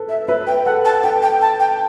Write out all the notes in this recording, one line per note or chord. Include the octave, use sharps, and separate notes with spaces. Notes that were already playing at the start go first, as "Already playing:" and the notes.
Already playing: A4 B4
E5
B4 E5
G5
A4 F#5
A5
B4 G5
G5
A5
G5